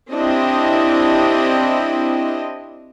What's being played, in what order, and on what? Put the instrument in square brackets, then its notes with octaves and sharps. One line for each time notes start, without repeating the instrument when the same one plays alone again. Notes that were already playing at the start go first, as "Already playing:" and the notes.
[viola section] C4 D4 E4 G4 D#5